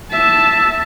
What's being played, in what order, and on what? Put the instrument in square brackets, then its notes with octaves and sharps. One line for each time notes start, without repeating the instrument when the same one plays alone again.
[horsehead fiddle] E5 A5